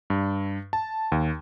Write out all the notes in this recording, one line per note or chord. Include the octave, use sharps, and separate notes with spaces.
G2
A5
D#2